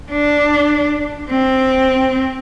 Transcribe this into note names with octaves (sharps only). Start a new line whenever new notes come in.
D4
C4